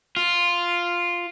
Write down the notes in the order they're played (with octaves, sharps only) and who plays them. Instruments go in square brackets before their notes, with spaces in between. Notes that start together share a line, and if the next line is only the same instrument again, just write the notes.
[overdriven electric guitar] F4